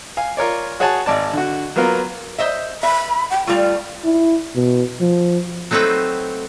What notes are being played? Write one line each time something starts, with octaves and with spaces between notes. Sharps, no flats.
F5 G#5
F4 A#4 C#5 D5
F#4 G#4 C#5 F#5 G#5 A5
G#1 D5 A5
D3 F#4
F#3 A#3 B3 F4 A#4
C5 D#5 E5
E5 B5
G5
G3 A3 F4
E4
B2
F3
F#3 A3 C4 D#4 B4 G5